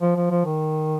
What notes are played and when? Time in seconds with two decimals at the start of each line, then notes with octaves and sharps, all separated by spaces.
0.01 F3
0.16 F3
0.30 F3
0.45 D#3